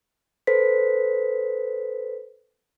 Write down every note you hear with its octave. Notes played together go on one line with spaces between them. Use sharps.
A4 B4 C5 B6